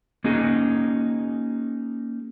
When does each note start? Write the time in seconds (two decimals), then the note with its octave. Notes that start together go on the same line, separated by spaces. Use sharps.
0.24 A#3 C#4 D#4 F#4 G#4